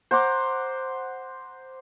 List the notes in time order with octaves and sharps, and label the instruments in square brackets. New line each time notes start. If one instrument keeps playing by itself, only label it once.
[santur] C5 F#5 A#5 D6